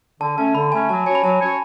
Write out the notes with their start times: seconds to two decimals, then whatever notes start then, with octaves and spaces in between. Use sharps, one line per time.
0.20 D3 A5
0.38 A3 C#4 A5
0.55 D3 B5
0.72 A3 C#4 G#5
0.89 F#3 A5
1.06 C#4 F#4 C#5 G#5
1.15 B5
1.23 F#3 A5
1.40 C#4 F#4 C#5